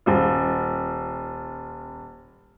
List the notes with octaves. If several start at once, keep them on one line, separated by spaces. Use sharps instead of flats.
D#1 F4